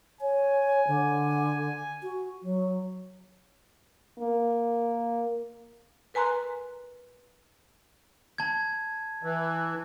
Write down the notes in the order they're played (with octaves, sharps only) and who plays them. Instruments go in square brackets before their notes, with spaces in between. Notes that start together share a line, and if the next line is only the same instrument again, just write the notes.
[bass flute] C#5 [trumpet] G#5
[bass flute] D3
F#4
F#3
[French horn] A#3
[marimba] A#4 B4 G#5 A#5 C6 F#6
[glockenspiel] A5 G#6
[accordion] E3